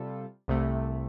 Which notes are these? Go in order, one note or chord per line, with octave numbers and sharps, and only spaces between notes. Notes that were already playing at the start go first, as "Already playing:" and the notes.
Already playing: C3 G3 F4 A4
C2 C3 A3